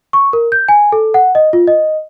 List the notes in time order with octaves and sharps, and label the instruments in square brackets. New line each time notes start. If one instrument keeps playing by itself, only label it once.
[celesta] C#6
A#4
G6
G#5
A4
F#5
D#5
F4
D#5